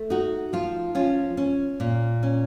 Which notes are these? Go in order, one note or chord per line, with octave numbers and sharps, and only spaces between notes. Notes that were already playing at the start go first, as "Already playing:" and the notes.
Already playing: A3
D#4 F#4
F3 F4
C#4 F4
C#4
A#2
C#4